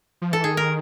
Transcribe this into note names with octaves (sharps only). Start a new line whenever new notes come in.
F3
E3 A4
D#3 G#4
A#4